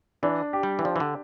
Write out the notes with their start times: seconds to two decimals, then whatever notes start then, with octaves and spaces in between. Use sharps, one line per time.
0.23 E3 D4
0.53 G4
0.63 G3
0.79 E3
0.84 F3 D4
0.96 E3
1.00 D3